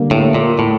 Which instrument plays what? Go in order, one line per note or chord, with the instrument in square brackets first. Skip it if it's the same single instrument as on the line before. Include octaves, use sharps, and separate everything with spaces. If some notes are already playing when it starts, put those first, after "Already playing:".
Already playing: [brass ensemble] D3 G3 A#3
[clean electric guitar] A2
A#2
A2